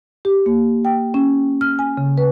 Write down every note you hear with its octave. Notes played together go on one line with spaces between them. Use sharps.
G4
A#3
G5
C#4
F6
G#5
C#3
B4